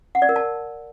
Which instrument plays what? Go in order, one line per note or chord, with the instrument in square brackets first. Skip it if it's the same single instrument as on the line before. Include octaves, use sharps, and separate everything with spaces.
[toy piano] F#5
D5
A#4
A5